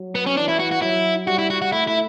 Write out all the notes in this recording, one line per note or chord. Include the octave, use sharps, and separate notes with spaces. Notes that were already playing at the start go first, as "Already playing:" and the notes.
Already playing: F#3
B3
C#4
E3 D4
E4
F#4
F#4
F#3 E4
G3 F#4
E4
F#4
F#4
A3 E4
E4